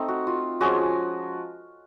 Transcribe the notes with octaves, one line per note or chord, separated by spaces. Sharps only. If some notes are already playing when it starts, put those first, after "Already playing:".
Already playing: A3 C4 D#4
F#4
F4
F3 G#3 C#4 F4 F#4 G#4